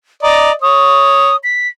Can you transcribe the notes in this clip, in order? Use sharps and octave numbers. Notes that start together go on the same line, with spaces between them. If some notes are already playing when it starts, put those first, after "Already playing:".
D5 D#5 A#5
C#5 D#6
B6